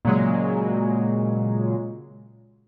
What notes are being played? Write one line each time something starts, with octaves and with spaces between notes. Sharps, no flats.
A#2 C#3 F#3 G#3